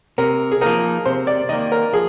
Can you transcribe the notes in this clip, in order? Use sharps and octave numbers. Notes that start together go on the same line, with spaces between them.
C3 A#4
G#4
F3 A#3 D#4 A#4
C3 C5
D5
D#3 A#3 D#5
A#4
F3 G#4